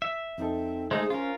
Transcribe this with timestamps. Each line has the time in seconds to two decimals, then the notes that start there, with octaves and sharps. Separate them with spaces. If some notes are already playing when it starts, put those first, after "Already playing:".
0.02 E5
0.38 F2 C4 D#4 A4
0.91 G#3 A3 D#4 G#4 C5
1.10 C#4 F4 A#4